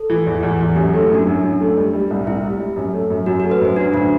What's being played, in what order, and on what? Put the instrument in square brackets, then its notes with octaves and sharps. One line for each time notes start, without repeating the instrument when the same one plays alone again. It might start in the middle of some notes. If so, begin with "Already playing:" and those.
Already playing: [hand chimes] A4
[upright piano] E3
E2
E2
E2
[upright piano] F#2 [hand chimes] G4
[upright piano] A3 [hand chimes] F#4
[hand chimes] E4
[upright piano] F#2 [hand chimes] D4
[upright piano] F#2
F#2
A3
G3
G3
C2
[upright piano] C2 [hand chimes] E4
[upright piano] G3
G3
F#2
A3
F#2
[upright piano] F#2 [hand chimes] F#4
[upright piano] A3 [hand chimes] F#4
[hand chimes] B4
[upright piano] F#2 [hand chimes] C5
[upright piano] F#3 [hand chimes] D4
[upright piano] D2 [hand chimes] D4